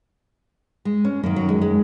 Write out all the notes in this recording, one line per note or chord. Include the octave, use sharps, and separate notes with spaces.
G#3
C#4
F#2 D#3 A#3
F#3
G#3
G#3